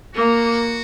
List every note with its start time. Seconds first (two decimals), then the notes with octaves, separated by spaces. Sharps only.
0.14 A#3 F#4